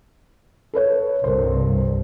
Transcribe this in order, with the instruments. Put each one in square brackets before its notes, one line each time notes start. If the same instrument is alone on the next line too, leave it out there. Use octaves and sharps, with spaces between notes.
[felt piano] A4 B4 C#5
[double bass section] C2 G2 [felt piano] A#4 C5